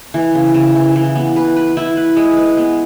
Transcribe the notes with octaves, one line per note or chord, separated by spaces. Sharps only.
E3
C#3
C#3
E3
E3
B3
B4
B4
E4
B4
G#3
B4
B3